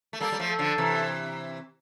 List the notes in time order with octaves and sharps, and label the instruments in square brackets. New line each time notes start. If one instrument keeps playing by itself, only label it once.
[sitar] A3
[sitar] G3 A#3 [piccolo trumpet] A4
[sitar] G3
F3 A3
[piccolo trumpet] A4
[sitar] D3 F3
C3 E3